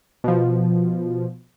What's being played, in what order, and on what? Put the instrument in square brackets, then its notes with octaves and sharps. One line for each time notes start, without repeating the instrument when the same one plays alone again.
[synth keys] B2 F3